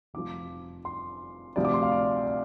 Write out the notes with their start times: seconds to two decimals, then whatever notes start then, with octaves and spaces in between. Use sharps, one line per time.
0.14 F1 F2 F3 D6
0.85 C6
1.56 D2 C3 F3 D5
1.65 D6
1.74 C6
1.83 F5
1.92 D5
2.27 F5